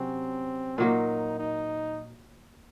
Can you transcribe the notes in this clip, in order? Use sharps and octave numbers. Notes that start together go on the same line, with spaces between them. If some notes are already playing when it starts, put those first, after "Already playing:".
Already playing: C3 F#3 C4 C#4
A#2 F#3 A#3 D#4
D#4